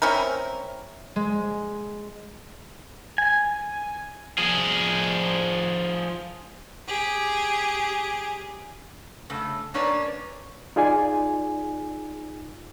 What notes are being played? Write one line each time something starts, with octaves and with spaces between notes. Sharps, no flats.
C4 C#4 E4 A#4
G#3
G#5
F3 G#4
G4 G#4
C#3 A3
A#3 C#4 D4 B4 C#5 D5
D#4 F4 G#4 D5 G#5